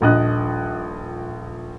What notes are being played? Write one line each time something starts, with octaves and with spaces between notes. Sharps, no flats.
D#1 A#1 D#5 F#6